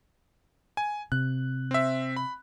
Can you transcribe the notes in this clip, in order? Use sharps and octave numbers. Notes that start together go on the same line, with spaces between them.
G#5
C3 F#6
C4 E5
B5